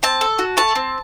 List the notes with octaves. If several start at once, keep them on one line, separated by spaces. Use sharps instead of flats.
C4 A5
A4
F#4
A3 A5
C4